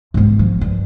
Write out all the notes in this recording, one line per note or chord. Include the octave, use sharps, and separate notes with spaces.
G#2 B3
F3
G2